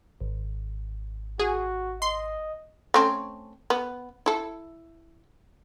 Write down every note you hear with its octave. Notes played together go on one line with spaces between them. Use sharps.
G#1
F#4 G#4
D#5 C6
A3 C4 C#4
B3
E4 A4